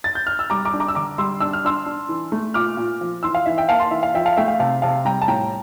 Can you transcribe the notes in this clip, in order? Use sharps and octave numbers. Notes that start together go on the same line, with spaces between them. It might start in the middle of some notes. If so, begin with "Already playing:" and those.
A6
G6
F6
E6
G3 A#5 D6
A#5 D6
D4
A#5 D6
E6
D3 A#5 D6
G3 C6 E6
D4 E6
F6
D4 C6 E6
D4
E3
A3
A#2 D6 F6
A#2
F3
E3 C6 E6
F5
E3 E5
E5 G5
A#3 F5 A5
A5 C6
E3 E5
F5
F3 E5 G5
F5 A5
A3 E5 G5
F5
C3 F5 A5
C3 F5 A5
G3 G5 A#5
A5
A2 G5 A#5